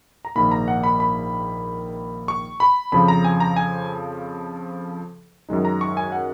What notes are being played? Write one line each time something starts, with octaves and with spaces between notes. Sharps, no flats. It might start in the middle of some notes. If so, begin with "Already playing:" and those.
A#5
A#1 G#2 D#3 A#3 B5
A#5
F#5
B5
B5
C#6
B5
F2 C#3 F3 B5
A#5
G#5
A#5
G#5
F#2 D#3 G#3 D#4
A#5
C#6
G#5
F#5